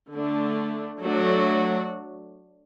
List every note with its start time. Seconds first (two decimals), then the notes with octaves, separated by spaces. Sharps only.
0.12 D3 A3 D4
1.02 F#3 A3 D4 F#4